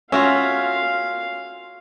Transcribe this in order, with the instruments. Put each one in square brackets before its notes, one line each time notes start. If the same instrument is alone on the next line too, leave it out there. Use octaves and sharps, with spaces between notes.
[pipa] C#4 [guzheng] F4 F#4 E5 [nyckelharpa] F5